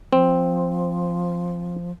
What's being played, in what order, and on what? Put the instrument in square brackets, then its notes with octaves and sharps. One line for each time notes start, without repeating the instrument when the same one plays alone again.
[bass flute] F3 [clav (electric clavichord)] C4